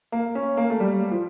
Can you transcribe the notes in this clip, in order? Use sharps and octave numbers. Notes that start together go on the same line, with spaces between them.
A#3
C#4
A#3
A3
G3
F3